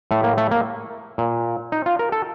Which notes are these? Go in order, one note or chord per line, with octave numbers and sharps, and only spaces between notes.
A2 A3
A#3
A3
A#3
A#2
D#4
F4
A#4
A4